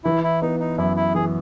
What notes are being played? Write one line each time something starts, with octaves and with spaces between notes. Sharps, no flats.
E3 E4
E4
B3 D#4
D#4
F#2 E4
E4
E3 G#4